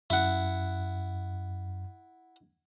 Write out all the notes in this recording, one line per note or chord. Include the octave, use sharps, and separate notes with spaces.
F#2 E4 F#5